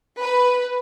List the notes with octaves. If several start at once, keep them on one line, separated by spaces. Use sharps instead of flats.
B4